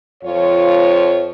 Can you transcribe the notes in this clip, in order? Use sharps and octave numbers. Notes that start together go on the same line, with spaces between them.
F2 F3 F4 C#5